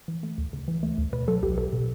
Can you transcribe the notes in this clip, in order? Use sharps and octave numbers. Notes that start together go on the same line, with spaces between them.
E3
A3
D2
C#3
E3
A3
D2
B2 B4
F#3 A4
B1 G4
B1 A4
B2